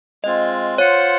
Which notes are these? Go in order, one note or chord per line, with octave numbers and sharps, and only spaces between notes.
G#3 C4 F4 D#5
F4 C5 C#5 F#5